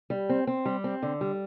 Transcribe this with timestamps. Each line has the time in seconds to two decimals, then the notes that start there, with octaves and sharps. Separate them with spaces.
0.10 G3
0.29 C4
0.47 C4
0.65 G3
0.84 C4
1.03 D3
1.21 G3